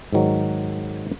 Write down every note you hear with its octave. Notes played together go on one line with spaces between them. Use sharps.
G#2 D#3 F#3